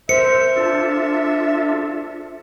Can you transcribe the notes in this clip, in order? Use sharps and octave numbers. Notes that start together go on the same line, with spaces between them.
A#4 C5 E5 C#7
D4 F4 A4